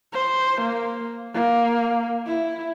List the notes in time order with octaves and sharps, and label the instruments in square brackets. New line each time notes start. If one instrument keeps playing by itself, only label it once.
[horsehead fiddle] C5
A#3
A#3
E4